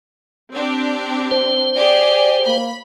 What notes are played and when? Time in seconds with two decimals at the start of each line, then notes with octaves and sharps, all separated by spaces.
0.52 C4 D4 G4
1.31 C5
1.75 G4 G#4 D5
2.46 A#3 B5